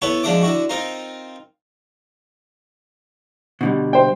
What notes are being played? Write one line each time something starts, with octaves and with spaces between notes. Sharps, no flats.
B3 E4 A4 B4 C#5
F3 G#3 D4 E5 F#5 D6
D3 E4 F#4
C4 D#4 F4 A#4
B2 D3 G3
C5 G5